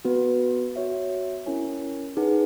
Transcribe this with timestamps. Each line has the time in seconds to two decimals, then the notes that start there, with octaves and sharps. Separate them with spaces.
0.05 B3 F#4 B4
0.76 F#4 C#5 E5
1.46 C#4 E4 A#4 C#5 G#5
2.17 D#4 G#4 B4 F#5